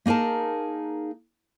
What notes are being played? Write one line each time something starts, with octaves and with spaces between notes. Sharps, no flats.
A#3 D#4 G#4 A#4 A5